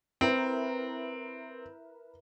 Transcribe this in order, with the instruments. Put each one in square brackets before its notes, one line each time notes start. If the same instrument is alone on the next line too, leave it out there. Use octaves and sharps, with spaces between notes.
[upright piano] C4 [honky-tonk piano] E4 A#4 B4